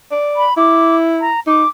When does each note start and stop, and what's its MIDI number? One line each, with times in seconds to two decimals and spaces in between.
0.12 0.46 74
0.36 0.54 83
0.57 1.32 64
0.57 0.96 86
1.21 1.40 82
1.47 1.64 63
1.47 1.68 86